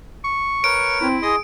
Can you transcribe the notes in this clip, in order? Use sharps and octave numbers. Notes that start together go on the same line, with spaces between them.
C#6
A#4 B4 C#5 D7
C4 E4
G#4 D#5 C6 D#6